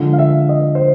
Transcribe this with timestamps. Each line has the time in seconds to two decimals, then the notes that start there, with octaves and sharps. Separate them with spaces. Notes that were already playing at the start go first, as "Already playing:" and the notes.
Already playing: D3 F3 G#3
0.13 F5
0.19 E5
0.49 D#5
0.75 C5